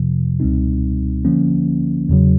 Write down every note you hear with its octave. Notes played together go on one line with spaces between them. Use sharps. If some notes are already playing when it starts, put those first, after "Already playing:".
Already playing: F2 C3 F3
C#2 B2 G3 C4 D#4
D3 F3 A#3 C#4
E2 C#3 F#3